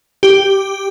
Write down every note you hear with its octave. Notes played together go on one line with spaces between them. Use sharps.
G4